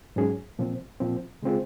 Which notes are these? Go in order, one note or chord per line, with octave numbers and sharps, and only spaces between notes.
G#2 F#3 C#4 G#4
A#2 F3 C4
A#2 F3 C4
C#3 G#3 C4 F4 G#4